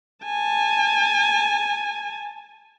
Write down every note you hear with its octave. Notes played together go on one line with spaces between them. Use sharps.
G#5 A5